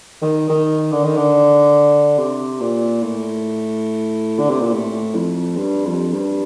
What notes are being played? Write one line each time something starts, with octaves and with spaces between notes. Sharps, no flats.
D#3
D#3
D3
D#3
D3
C3
A#2
A2
D3
C3
A#2
A2
F2
G2
F2
G2